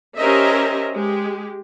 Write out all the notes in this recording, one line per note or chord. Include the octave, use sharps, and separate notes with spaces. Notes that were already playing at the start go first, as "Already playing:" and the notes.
C#4 G4 A#4 C5 D#5 E5
G#3 G4